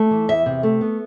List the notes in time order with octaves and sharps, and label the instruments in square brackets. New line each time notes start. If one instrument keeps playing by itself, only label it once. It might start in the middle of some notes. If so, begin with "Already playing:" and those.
Already playing: [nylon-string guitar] A3
E3
E2 E5
C3
A3
B3